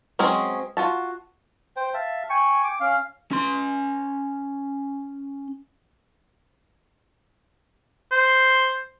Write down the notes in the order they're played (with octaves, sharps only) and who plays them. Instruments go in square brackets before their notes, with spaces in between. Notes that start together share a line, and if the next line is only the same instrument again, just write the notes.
[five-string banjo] F#3 G#3 C4 C#4 G#4
F4 F#4 A5
[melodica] C5 G5
E5 F5 A5
[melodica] G5 G#5 [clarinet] C#6
[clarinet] D6
[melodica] C#4 [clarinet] F5
[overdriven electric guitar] C#4 C6
[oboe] C5